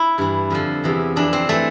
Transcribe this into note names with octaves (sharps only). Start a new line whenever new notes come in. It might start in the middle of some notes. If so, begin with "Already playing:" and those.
Already playing: E4
G2 E3
F2 D3 F3
E2 C3 E3
F2 E3 D4
C4
E3 A3